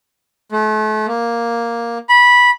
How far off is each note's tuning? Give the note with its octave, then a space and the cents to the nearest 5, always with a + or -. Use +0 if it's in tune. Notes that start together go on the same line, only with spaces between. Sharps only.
A3 -35
A#3 +5
B5 -15